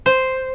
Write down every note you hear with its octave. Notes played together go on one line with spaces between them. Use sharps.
C5